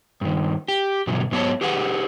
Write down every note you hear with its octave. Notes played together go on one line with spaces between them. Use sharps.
G2 D#3
G4
G2 B2 D3 E3 F#3
G#2 F#3 B3 G#4 C#5 A5
G4 G#4 B4 F#5